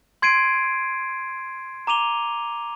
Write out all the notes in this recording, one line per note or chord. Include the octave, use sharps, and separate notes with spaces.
C6 G#6 C7 D7 D#7
A#5 D6 D#7 F7 G7